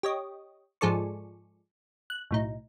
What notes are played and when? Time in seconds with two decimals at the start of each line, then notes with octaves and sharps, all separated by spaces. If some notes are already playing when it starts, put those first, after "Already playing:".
0.03 G4 C#5 D#5
0.81 G#2 F3 G#4 A4 D5 C#6
2.10 F#6
2.31 B1 A2 D#4